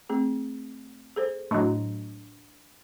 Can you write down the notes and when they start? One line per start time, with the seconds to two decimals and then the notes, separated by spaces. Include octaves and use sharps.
0.09 A3 C4 G#4
1.16 G#4 A4 C5
1.51 A2 F#3 D4 D#5 A#5